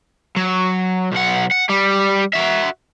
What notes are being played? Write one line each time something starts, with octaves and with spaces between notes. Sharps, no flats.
F#3
B1 F#5
F#5
G3
F#4 E5